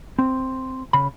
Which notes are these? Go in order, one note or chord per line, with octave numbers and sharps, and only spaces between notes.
C4
C#3 B5